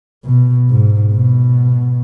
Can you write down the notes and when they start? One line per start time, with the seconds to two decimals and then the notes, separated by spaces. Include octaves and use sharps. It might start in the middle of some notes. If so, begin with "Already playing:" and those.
0.25 B2
0.69 G#2
1.13 B2